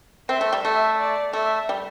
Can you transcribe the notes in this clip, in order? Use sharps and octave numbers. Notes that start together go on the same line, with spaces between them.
C4 E5
A3
G3
A3 E5
D5
A3 E5
G3